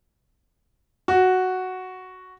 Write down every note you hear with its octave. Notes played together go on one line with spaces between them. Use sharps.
F#4